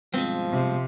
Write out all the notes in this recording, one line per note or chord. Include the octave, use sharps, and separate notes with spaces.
G2 B2 F3 G#3 C4
C3